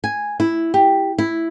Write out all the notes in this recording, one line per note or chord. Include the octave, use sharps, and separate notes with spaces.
G#5
E4
G4
E4